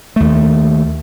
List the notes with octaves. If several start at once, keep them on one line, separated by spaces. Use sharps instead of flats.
D#2 A3